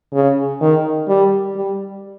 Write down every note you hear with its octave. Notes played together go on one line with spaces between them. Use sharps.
C#3
D#3
G3
G3